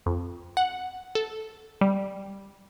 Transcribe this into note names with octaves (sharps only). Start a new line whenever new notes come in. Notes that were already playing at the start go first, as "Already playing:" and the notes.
F2
F#5
A4
G3